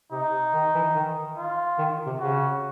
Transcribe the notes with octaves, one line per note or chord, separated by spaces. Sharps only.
C3 D#4
D#3
E3
D#3
F4
D#3
C3
C#3 F#4